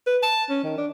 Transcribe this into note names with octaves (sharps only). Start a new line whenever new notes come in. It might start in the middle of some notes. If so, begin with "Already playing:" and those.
B4
A5
C#4
D#3
D4